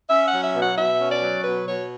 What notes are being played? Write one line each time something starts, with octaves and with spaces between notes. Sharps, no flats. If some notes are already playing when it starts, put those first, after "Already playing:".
C#4 E5
F#5
F#3
E5
B2 F#5
B2 E5
C#4
D5
F#3
B2 B4
B2 C#5